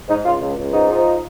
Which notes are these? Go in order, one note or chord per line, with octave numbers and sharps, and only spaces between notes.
G#2 D#4
C#2 F4
C#2
C#2
G#2 D#4
F3